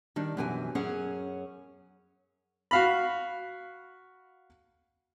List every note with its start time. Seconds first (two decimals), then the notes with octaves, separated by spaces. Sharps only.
0.16 D#3 G3 D4
0.37 F#2 B2 E3 G4 G5 G#5
0.75 F#2 C#4 G#4 F#5
2.71 F#4 F5 B5